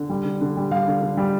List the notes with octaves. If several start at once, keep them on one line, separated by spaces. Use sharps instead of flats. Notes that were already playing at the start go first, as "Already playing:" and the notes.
Already playing: D3
G3
D3
D3
G3
G3 F5
D3
D3
G3